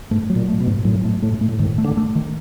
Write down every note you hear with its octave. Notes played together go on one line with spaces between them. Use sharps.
G#2 A3
F#3
A#2
A3
B2
G#2
A2 F#3
A3
A2 A3
A3
A2
G#2 D#3
A3
D3
A3
D#3